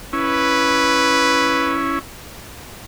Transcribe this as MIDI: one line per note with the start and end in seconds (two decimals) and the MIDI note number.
0.13 1.99 61
0.13 1.99 64
0.13 1.80 71